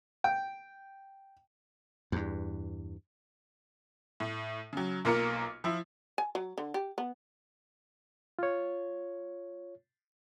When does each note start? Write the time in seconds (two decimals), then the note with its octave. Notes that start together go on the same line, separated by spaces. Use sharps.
0.24 G5
2.12 E2 G2
4.20 A2
4.73 C#3 F#3
5.05 B1 A#3 F4 A#4 F6 C#7
5.64 F3 E4
6.18 G#5
6.35 F#3
6.58 D3
6.74 G4
6.98 B3
8.39 F4 C#5